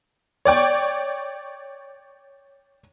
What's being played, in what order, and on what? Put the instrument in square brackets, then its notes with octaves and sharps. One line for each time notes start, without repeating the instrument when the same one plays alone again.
[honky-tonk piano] C#5 D5 G5 C#6